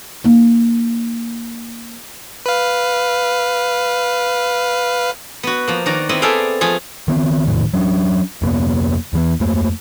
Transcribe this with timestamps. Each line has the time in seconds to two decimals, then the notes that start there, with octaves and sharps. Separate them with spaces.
0.24 A#3 D#4
2.46 B4 F5
5.43 B3 F#4
5.68 F3 A#3
5.86 D#3 F#4 D5 A#5
6.09 B3 C4 E4 D#5
6.22 G#4 A4 D5 E5 F5 G5
6.61 F3 A3 F4 G#4
7.08 D#3 B3 C4
7.46 F1 E2 A2 D#3
7.73 F#3 C#4 D4
8.42 F2 C3 A#3 B3
9.13 E2 E3 B3
9.40 F2 A3 A#3